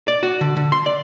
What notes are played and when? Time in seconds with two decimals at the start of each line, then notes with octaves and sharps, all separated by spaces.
0.08 D5
0.23 F#4
0.41 D3
0.56 D3
0.72 C6
0.86 D5